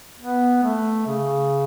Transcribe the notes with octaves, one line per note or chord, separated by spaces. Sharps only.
B3
A3
C#3